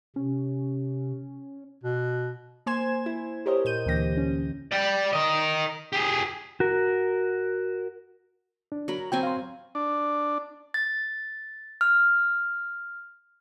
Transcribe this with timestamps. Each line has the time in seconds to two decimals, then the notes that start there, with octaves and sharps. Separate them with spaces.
0.16 C3 C#4
1.84 B2
2.66 A#3 C5 G#5 C6 G#6 E7
3.06 E4
3.46 G4 A#4 C5 C#5 D#5
3.65 A#2 G6 D#7
3.86 D2 D3 E3 A#3 G4 A#6
4.17 C#4
4.72 D5 G5
5.13 A#4 D#5
5.93 G4 G#4
6.60 F#4 A#4
8.72 D4
8.88 F#3 A#4 B5
9.12 F#3 C4 G5 G#5
9.23 F5 C6
9.75 D4
10.74 A6
11.81 F6